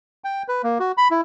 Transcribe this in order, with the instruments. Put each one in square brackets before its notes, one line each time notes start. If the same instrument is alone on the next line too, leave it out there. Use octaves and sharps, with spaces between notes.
[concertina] G5
B4
A#3
F#4
B5
E4